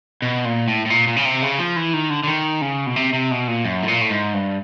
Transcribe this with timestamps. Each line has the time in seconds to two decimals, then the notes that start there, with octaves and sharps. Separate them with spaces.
0.22 B2
0.45 A#2
0.68 A2
0.86 A2
0.90 A#2
1.07 A#2
1.16 C#3
1.25 C3
1.42 C#3
1.59 F3
1.76 E3
1.93 D#3
2.10 D3
2.23 D3
2.27 D#3
2.61 C#3
2.86 B2
2.96 C3
3.13 C3
3.31 B2
3.48 A#2
3.65 F#2
3.83 A2
3.88 A#2
4.01 A2
4.10 G#2
4.34 G2